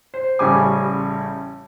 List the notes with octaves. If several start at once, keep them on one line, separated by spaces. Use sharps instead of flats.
C5
A1 C#3 G3 G#5 D6